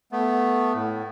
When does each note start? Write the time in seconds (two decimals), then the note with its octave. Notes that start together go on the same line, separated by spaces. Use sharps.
0.12 A3 B3
0.75 A2